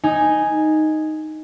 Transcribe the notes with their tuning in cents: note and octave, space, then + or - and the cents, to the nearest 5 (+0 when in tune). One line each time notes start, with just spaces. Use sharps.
D#4 +0 G#5 +0